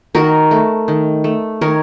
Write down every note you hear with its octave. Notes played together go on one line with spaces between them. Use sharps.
D#3 F#4 A#4
A3
D#3
A3
D#3 A#4 C#5